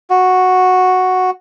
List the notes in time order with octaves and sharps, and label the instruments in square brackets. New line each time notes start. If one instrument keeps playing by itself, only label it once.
[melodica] F#4